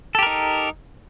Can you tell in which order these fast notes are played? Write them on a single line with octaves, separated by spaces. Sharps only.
A4 G4 A#4 D#4